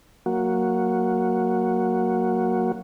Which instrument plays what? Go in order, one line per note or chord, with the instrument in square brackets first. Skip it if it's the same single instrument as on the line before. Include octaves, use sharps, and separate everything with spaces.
[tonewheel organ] F#3 A#3 F#4